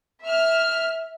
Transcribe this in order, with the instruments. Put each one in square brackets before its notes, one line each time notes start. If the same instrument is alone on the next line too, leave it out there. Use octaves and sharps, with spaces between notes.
[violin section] E5 F6